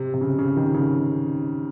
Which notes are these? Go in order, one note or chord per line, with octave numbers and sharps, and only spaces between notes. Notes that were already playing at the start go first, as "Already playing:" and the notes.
Already playing: C3
C3
C#3
C#3
D#3
C#3